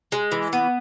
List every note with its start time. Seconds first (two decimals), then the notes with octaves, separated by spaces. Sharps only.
0.12 G#3
0.32 E3
0.53 B3